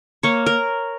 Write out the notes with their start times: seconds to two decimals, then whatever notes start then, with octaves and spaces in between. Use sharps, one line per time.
0.23 A#3 C#5
0.46 A#4